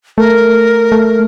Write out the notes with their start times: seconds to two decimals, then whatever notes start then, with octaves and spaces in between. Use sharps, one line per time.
0.18 A3 A#4
0.92 A3